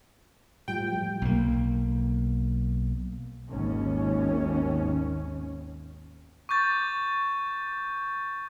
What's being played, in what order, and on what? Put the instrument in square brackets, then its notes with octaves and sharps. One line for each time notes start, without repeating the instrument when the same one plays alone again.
[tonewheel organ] A2 F3 G3 [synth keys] G5
[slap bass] B1 A#3
[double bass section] G#1 D#2 C#4
[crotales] C#6 D6 G6 A6